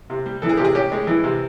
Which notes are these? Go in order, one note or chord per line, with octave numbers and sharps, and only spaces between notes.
C3
G3
E3 A4
G#4
C3 G4
G#4
C#4 G4
G#3
E3
C3